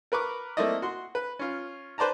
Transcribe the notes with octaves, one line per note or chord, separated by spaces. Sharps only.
A#4 B4 C#6 D6
A3 A#3 C4 E4 D5 D#5
F#4 C6
B4
C#4 F4
B4 C5 D5 A5 A#5